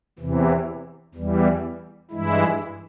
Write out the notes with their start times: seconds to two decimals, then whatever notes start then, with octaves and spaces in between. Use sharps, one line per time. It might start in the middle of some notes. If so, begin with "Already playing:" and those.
0.19 E2 C3 E3
1.14 E2 E3 G3
2.11 G2 E3 G#3 E4